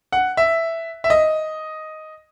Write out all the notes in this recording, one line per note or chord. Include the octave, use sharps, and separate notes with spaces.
F#5
E5
E5
D#5